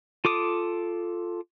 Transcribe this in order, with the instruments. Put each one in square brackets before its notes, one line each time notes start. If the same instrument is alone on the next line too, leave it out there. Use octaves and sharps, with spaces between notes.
[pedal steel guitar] F4 A4 D6 D#6